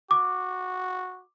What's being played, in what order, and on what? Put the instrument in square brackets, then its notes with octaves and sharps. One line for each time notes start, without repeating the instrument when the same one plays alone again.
[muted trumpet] F#4 [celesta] D6